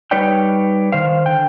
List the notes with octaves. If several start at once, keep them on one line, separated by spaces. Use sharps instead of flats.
G3 D#4 B4 C#5 D5 G5
D#3 C5 F5
D3 G5